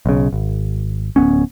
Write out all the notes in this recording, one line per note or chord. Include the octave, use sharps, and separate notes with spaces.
B1 C#3
G#1
D1 G2 B3 C#4